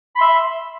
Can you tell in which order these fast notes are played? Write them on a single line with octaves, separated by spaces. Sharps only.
B5 C6 E5